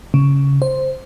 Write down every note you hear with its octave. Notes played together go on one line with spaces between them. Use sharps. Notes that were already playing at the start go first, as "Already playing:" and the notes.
C#3
C5